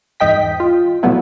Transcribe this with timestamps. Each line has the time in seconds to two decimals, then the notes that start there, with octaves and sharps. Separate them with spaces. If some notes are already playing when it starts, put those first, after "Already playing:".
0.20 E2 G#2 D#5 G5 B6
0.60 F4
1.03 B2 F#3 G3 A3 B3 E4